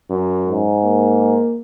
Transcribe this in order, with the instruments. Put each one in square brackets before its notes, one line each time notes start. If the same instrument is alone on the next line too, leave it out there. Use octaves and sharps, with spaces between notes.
[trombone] F#2
[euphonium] G#2
[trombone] A#3